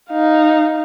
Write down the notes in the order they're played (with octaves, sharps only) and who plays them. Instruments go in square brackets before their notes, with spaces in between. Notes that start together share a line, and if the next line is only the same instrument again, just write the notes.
[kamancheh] D#4 F5